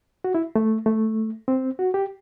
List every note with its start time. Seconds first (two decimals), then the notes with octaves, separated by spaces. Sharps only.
0.24 F#4
0.35 E4
0.55 A3
0.86 A3
1.48 C4
1.79 F#4
1.94 G4